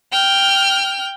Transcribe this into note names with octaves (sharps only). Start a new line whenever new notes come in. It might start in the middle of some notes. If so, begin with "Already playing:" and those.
G5 F6